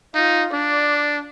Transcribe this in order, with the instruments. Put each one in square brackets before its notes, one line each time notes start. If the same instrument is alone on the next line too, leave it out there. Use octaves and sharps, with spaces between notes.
[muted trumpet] D#4 [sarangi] F4
[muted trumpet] D4 [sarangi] D5